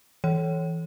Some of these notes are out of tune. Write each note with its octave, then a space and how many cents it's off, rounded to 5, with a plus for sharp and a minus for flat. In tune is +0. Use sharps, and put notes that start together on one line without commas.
E3 +0 C#5 -10